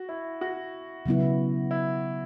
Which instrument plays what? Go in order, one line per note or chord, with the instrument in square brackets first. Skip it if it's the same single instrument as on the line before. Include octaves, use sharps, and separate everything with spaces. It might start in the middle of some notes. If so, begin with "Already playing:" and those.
Already playing: [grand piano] F#4
E4
F#4
[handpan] C#3 F#3 B3 E4
[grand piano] E4